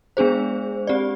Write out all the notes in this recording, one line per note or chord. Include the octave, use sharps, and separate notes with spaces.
G#3 B3 D4 G#4 C5
C4 G4 D5